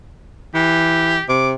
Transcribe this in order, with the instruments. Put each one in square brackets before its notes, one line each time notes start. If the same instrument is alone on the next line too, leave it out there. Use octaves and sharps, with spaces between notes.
[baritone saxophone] E3 [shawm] G4
[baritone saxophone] C3 [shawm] D6